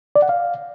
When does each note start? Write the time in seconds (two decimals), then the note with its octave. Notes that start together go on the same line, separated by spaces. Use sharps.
0.16 D5
0.22 F#5
0.29 F5